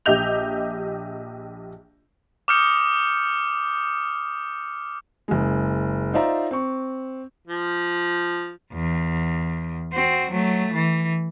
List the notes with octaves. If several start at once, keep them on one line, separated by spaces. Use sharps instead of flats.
A#1 G4 D#5 E5 G6 F7
D6 D#6 F6 G6 C#7
F#1 G#3
D#4 F4 C5 D5 E5 A#5
C4 C#6
F3
E2
C4 F#4
F#3 A3
E3